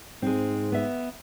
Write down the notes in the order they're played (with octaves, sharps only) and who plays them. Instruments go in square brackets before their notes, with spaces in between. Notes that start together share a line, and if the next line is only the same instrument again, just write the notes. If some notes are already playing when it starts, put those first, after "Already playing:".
[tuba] G#2 [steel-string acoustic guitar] G#3 C4
[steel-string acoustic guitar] B3 E5